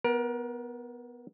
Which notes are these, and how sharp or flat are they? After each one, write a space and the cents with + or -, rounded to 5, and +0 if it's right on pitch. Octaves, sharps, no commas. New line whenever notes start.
B3 +0 A#4 +30